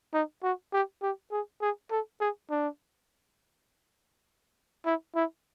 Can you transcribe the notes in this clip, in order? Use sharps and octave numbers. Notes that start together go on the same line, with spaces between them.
D#4
F#4
G4
G4
G#4
G#4
A4
G#4
D4
E4
E4